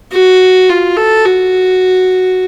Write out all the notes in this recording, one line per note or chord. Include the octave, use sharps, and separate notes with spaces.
F#4
F4
A4
F#4